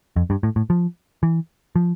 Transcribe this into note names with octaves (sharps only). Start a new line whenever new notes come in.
F2
G2
A2
A2
F3
E3
F3